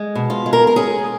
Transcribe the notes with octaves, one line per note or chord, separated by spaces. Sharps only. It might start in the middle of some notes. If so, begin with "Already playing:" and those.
Already playing: G#3
B2
F4
G#3
A#4
A#4
C#4 G#4